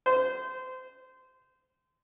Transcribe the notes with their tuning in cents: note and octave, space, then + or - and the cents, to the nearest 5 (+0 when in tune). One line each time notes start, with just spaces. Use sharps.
C5 -25